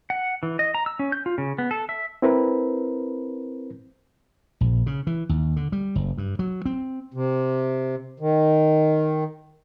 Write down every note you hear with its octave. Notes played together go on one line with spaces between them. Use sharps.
F#5
E3
D#5
A#5
E6
C#4
G6
F4
C#3
B3
A4
E5
C4 E4 A#4 B4 B5
A#1
C#3
E3
D#2
D3
G3
F#1
G2
F#3
C4
C3
D#3